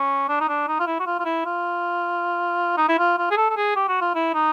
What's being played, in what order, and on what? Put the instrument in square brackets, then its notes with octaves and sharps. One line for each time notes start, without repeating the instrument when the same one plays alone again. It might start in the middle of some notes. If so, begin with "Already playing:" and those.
Already playing: [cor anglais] C#4
D4
D#4
D4
D#4
F4
E4
F#4
F4
F4
E4
F4
D#4
E4
F4
F4
G#4
A4
A4
G#4
G4
F#4
F4
E4
D#4